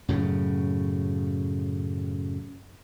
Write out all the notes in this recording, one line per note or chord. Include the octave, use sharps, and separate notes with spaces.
F#2 A2 C#3